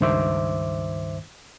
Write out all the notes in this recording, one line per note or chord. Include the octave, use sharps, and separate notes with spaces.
C#2 G2 D#3 C5 E5 D6